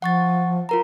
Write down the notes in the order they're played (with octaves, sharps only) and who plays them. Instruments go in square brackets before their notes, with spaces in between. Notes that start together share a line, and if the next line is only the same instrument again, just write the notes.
[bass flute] F3 [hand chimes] F#5 C#6 A6
[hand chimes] F4 A#4 A#5